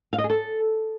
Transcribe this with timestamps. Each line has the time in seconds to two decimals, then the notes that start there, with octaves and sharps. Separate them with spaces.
0.13 F5
0.18 D#5
0.24 G#4
0.30 A4